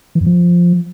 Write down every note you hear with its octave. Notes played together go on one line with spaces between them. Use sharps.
E3
F#2
F3